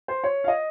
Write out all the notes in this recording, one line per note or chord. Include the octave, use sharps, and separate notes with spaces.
C5
C#5
F5
D#5